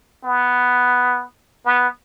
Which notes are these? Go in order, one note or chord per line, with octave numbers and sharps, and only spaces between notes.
B3
B3